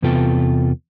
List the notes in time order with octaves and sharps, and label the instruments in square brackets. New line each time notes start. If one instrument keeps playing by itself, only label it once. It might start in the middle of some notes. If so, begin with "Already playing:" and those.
[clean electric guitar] E2 C3 B3 F4 A4 G5